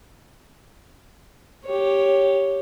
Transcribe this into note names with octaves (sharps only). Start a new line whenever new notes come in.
G4 C#5